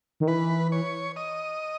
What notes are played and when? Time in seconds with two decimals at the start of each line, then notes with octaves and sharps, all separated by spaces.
0.20 D#3
0.27 E3 B4
0.72 C#5
1.16 D#5